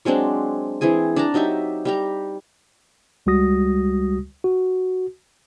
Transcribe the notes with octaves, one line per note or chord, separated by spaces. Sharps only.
F#3 G#3 C4 D4
E3 C4 G#4 G#5
D4 A5 A#5
F#3 D#4 G4 E5
G3 G4 A#5
C#2 G3 G#3 F#4 D#6 A#6
F#4